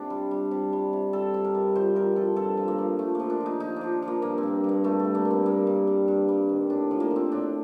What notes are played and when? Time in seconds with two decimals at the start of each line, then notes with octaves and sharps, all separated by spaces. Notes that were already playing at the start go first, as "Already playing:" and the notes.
Already playing: C3 D4
0.10 G3
0.31 G3
0.51 C3
0.73 G3
0.93 C3
1.13 G3 A4
1.34 C3
1.45 A#4
1.55 G3
1.76 F3 C5
1.95 F3 A#4
2.16 F3 A4
2.36 G2 A4
2.57 F3
2.68 A#3
2.78 F3
2.99 F3 A3
3.15 F3 A#3
3.30 D4
3.41 F3
3.46 D#4
3.60 F3 D#4
3.76 F3 D4
4.02 F3
4.08 A#3
4.22 G2 A#3
4.38 C4
4.43 G2
4.64 G2 A#3
4.84 G3 A3
5.00 G2 A3
5.15 A#3
5.25 G3
5.31 C4
5.46 G2 A#3
5.67 G2
5.87 G3
6.08 G2
6.29 G3
6.49 D#3
6.70 A2 D4
6.91 F3
7.00 A#3
7.11 F3
7.16 C4
7.32 A2 D4